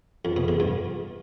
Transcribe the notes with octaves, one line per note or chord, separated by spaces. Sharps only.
F2
B2
E2
G2